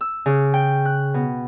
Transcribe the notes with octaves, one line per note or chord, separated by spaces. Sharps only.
E6
C#3
G5
F#6
B2